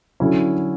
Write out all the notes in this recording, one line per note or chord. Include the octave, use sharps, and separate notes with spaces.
D3 F#3 C#4 E4